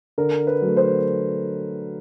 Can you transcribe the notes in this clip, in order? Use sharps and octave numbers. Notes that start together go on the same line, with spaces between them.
D3 A#4
B4
F#3 A3
C5